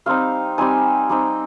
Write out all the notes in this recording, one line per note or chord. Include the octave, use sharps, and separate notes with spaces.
G3 C4 D#4 F5
G3 C4 D#4 G#5
G3 C4 D#4